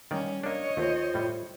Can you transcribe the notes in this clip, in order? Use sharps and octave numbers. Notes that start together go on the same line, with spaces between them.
D#3 G3 A#3 C#4 D5
A#3 D4 C#5 D#5
D#2 A3 F4 C5
A2 G3